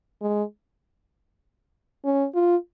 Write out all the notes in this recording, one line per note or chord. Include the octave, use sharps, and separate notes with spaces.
G#3
C#4
F4